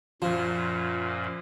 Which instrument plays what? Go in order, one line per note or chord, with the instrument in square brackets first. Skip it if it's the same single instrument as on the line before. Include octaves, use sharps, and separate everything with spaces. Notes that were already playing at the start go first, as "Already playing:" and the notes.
[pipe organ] F#2 A#2 [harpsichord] F3